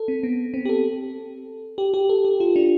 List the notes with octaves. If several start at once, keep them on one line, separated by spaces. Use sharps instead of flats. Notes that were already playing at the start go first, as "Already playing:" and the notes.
Already playing: A4
C4
B3
C4
G4
A4
G4
G4
A4
G4
F4
D4